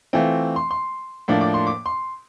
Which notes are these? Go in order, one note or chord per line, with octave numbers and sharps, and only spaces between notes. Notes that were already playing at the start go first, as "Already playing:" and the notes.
E3 A3 C4 F4
C6
C6
A2 F3 A#3 D4
D6
C6
D6
C6